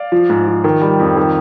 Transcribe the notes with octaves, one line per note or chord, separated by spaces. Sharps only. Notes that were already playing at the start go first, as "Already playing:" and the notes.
Already playing: D5 F5
F3
G#2
F3
D#3
G3
F2
D#3